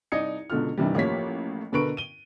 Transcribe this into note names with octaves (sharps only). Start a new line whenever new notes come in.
C2 D#4 D5 D#6 G#6 C#7
C#2 B2 D3 F4 F6
G2 C3 D#3 E3 G3
A1 F3 A#3 G4 C#5 B6
B2 D3 A#4 B4 C#6 D7
D#7 G7